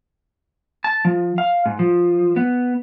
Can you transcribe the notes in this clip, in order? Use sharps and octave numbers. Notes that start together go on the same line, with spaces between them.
A5
F3
F5
G#2
F3
B3